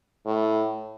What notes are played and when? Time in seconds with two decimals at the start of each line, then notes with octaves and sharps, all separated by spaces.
0.26 A2